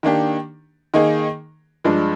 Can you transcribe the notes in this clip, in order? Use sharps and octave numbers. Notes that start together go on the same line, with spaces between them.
D#3 A#3 D4 G4
D#3 A#3 D#4 G#4
G2 F3 G#3 D4